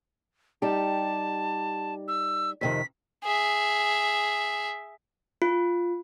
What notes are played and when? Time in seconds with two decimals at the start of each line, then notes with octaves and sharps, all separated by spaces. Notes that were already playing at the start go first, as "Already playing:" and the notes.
0.62 G3 D#4 G4 A5
2.08 E6
2.61 F2 C3 D#3 B6
3.24 G#4 E5
5.42 F4